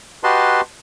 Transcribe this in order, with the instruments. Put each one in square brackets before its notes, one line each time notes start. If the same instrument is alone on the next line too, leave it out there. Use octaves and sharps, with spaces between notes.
[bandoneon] F#4 G4 B4 D#5 A5 C6